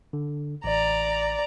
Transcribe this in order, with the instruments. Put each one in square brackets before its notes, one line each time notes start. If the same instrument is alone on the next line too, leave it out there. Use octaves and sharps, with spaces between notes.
[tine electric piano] D3
[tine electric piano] A1 [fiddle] D5 A#5